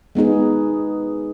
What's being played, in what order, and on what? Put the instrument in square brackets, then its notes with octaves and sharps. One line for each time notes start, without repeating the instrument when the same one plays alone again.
[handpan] G#3 B3 D#4 G#4